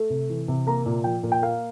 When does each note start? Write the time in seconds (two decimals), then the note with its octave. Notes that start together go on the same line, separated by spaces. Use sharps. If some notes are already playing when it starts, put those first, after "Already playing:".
Already playing: A3
0.10 C3
0.30 E3
0.48 C3
0.67 A#3 A#5
0.86 A#2
1.04 F3 G5
1.23 A#2
1.32 G5
1.42 A#3 F5